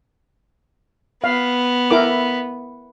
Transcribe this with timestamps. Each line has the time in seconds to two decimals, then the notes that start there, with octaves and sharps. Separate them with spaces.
1.24 B3 F5
1.91 E4 A#4 D6